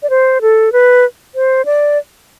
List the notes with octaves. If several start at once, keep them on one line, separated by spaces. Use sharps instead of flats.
D5
C5
A4
B4
C5
D5